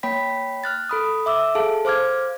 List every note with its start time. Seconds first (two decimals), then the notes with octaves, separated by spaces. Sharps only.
0.03 A#3 C#5 G5 B5 B6
0.64 F6 F#6 A6
0.89 A4 B5 D#6
1.26 E5 D6 E6
1.55 G#4 A4 F5 A5
1.85 C5 F5 D6 F6 G#6